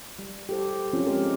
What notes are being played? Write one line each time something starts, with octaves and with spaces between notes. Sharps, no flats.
G3
G4 A4 C5
F3 C4 C#4 F4
G#3 G4 A#4